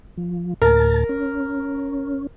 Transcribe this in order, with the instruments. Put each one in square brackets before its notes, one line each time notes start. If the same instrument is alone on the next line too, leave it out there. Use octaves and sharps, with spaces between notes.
[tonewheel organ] F3
[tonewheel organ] D2 A2 A5 [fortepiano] A#4
[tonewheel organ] C#4